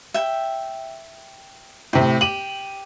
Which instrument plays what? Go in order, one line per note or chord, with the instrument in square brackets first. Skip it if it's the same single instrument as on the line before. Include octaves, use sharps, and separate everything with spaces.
[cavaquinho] E5 G5
[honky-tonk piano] A2 C3 [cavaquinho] G5
[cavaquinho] G4 [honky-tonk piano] D#7 F#7